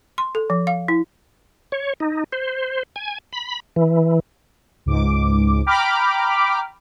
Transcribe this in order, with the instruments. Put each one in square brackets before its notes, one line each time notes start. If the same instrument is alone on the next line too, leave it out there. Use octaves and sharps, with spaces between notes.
[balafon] C6
A4
F3
F5
E4
[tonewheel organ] C#5
D#4
C5
G#5
B5
E3
[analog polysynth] C#2 G#2 D6
G5 A#5 B5 D6 F6